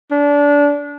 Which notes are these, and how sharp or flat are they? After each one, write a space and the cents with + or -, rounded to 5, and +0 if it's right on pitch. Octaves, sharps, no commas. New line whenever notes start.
D4 -25